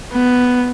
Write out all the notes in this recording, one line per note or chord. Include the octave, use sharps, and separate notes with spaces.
B3